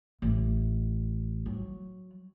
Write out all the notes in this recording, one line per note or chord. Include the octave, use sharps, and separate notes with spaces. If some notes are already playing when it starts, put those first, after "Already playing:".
A1
F#3